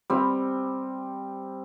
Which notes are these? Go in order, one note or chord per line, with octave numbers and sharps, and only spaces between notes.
G3 C4